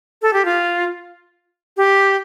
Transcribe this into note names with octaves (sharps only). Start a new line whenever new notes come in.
A4
G4
F4
G4